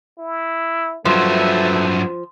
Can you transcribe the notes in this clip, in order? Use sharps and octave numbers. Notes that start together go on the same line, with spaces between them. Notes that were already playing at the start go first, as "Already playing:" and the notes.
E4
G2 F3 F#3 A3 B4 E5